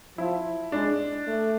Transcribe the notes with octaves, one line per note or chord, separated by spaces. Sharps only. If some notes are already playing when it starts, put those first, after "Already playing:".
F3 E4
G#3 D4
A3